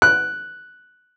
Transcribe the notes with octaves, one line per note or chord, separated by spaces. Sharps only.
F#6